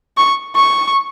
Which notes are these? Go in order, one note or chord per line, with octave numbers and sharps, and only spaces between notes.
C#6
C#6